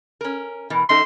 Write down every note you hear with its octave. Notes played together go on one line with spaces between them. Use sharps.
C#4 A#4
B2 E3 A#4
F#2 D#4 A4 C6